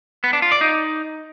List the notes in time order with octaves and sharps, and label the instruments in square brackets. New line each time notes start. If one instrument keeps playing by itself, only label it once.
[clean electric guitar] B3
D4
F4
D5
D#4